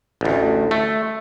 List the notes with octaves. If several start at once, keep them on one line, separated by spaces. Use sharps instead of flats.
A1 D2
A3